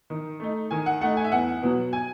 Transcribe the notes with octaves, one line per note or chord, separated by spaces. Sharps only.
D#3
A3 D#4
D#3 G#5
F#5
A3 D#4 F#5
G#5
E5
E2 F#5
B2 F#3
G#5